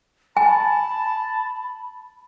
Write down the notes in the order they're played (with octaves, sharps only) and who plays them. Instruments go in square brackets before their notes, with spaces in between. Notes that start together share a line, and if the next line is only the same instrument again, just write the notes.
[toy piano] G#5 [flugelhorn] A5 [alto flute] B5